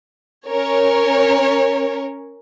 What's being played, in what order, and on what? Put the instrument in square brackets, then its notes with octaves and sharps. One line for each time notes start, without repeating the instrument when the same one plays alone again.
[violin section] C#4 A#4 C#5